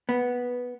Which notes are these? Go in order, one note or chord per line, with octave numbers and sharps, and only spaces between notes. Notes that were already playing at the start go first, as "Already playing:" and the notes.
B3